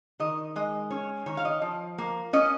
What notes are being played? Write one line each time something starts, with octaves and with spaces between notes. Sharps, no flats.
D#3 D#5
G#3 D#5
C#4 C#5
D#3 C#5
F5
D#5
F3
A#3
C#4 D#5